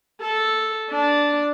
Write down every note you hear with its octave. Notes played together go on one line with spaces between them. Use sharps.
A4
D4